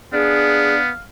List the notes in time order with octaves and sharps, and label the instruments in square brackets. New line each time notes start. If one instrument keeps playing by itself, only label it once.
[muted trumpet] B3 [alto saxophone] D4 [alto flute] G#4 [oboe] F5